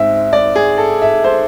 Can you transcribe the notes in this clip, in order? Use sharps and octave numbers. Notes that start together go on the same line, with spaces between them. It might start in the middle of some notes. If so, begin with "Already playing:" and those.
Already playing: G#2 G#3 C4 E5
D5
G#4
A4
E5
C5